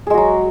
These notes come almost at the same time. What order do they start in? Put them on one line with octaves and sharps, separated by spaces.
G#4 G#3 F#4 F#3